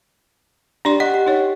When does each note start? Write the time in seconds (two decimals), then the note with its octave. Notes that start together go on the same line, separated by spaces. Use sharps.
0.85 D4 G4 D5 C6
1.00 D#5 F#5
1.14 G4
1.26 D#4 C#5